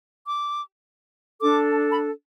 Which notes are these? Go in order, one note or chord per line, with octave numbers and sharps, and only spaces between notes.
D6
D4 A4 D6
B5